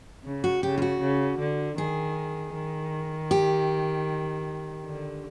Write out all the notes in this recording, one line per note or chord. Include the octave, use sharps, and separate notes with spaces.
C#3
F#4
C#3 G4
F4
F#4
C#3
D3
D#3 G#4
D#3
G4
D3